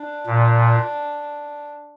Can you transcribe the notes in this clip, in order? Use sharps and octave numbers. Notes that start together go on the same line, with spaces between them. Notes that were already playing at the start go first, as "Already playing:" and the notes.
Already playing: D4
A#2